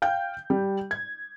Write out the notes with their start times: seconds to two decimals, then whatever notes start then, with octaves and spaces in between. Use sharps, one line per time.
0.02 F5 G5 G6
0.50 G3
0.91 G#6